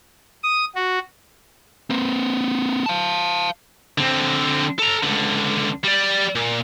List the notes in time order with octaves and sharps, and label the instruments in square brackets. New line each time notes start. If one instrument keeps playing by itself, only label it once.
[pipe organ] D#6
F#4
[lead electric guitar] A#3 C4
F5 A5
[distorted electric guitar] D3 C4
A4 A#5
C#2 D3
G3 D5
A#2